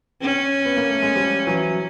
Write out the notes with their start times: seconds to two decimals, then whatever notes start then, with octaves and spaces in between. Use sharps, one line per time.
0.22 C#4
0.65 B3
0.77 A#3
0.90 A3
1.02 G#3
1.15 F3 G3
1.47 E3 F#3